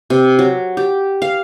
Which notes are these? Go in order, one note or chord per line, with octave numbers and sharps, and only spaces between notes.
C3
F#3
G4
F5